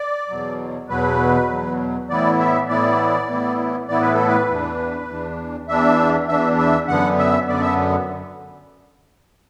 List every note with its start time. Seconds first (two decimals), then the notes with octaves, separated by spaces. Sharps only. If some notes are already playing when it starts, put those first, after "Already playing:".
Already playing: D5
0.29 E2 B2 F#3
0.89 E2 B2 F#3 B4
1.49 E2 B2 F#3
2.09 A2 E3 B3 E4 D5
2.39 E5
2.69 A2 E3 B3 E4 D5
3.28 A2 E3 B3 E4
3.88 A2 E3 B3 E4 D5
4.01 B4
4.14 A4
4.27 B4
4.48 E2 E3 D4
5.09 E2 E3 D4
5.68 E2 E3 D4 E5
6.28 E2 E3 D4 E5
6.59 E5
6.88 F#2 D3 B3 F#5
7.18 E5
7.48 F#2 D3 B3 D5
7.61 E5